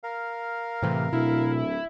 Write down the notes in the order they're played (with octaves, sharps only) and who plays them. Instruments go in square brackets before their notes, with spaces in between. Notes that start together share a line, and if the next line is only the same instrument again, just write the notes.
[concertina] A#4 F5
[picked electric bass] A2 E3 A3 [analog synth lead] C3
[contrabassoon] D1 [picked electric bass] B2 [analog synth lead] E4